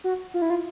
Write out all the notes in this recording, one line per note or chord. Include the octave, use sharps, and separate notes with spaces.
F#4
F4
E4
F4